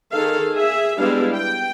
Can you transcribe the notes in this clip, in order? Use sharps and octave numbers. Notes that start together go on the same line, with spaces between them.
D#3 G#4 A4 F5
G#4 E5
G3 G#3 B3 D4 E4 F5
G5